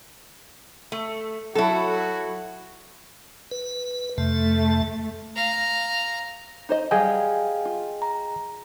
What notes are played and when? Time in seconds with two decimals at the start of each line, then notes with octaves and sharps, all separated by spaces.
0.92 A3
1.55 F#3 E4 F#4 A4
3.51 B4
4.18 F2 C3 A3 A5
5.36 F5 A#5
6.69 D#4 C5 D#5
6.91 F#3 G3 G#4 D#5 F5 G5 G#5
7.65 F4
8.02 A#5